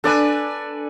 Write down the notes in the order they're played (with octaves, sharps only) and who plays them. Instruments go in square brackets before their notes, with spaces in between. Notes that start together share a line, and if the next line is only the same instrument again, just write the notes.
[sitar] D4 B4 [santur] A4 D5 G#5